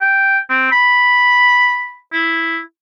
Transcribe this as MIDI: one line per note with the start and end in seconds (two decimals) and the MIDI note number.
0.01 0.38 79
0.50 0.69 60
0.72 1.97 83
2.12 2.58 64